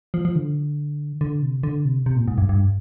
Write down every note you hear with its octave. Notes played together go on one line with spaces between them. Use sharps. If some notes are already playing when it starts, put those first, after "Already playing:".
F3
F3
D3
D3
C3
D3
C3
C3
A#2
G#2
G2
G2